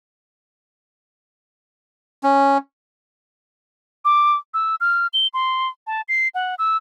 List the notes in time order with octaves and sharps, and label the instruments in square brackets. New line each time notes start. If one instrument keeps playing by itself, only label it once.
[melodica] C#4
[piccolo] D6
E6
F6
G7
C6
A5
C7
F#5
E6